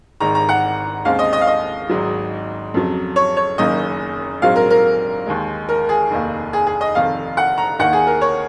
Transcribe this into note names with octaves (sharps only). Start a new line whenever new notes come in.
G#1 G#2 D#3 A#5
A#5
F#5
D#2 C#3 G#3 C4 F5
D#5
D#5
F5
D#5
G#1 G#2 F#3
F2 C#3 F#3
C#5
C#5
F#1 F#2 D#3 A#3 D#5
A#1 G#2 F#3 C4 F5
A#4
A#4
D#2 D#3 G#3
A#4
G#4
F1 D#2 D#3 A#3
G#4
G#4
D#5
F1 F2 D#3 F5
F#5
A#5
D#2 D#3 A#3 F#5
G#4
A#4
C#5